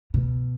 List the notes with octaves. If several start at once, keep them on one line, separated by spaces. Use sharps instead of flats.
B2